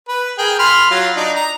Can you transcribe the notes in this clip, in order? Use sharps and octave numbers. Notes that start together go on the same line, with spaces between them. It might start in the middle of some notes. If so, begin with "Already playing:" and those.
B4
G#4 A#4 G5
B5 C6 F6
F#3 F4
D4 D#4
A#5